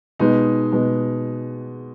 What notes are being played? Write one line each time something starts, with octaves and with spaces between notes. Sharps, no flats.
B2 G#3 B3 D#4
B2 G#3 B3